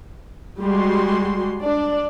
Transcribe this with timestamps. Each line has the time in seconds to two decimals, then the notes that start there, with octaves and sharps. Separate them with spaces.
0.61 G3 G#3 F#4 C6
1.60 D4 D5